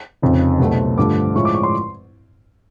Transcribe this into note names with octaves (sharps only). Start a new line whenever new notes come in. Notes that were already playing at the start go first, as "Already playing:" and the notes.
F1 F2 C#3
C2 B2 F#3 A3
G2 D3 F3 A3 D6
A2 F3 G#3 C#4 E4 C#6
D6
C#6
C6